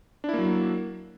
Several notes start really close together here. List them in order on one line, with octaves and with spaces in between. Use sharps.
D4 E4 A#3 F#3